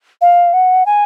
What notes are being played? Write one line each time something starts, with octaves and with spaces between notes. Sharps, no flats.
F5
F#5
G#5